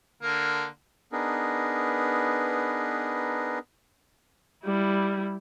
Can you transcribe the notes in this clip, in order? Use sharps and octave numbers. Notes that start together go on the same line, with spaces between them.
D3 A#3
B3 D4 D#4 G#4 A#4 B4
G3 E4